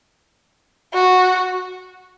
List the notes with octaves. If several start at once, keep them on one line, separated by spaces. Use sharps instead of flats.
F#4